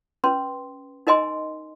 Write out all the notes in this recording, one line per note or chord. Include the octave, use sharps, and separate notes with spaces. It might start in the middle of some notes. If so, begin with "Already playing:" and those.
C#4 B4 C6
D#4 A#4 D#5 G#5 C6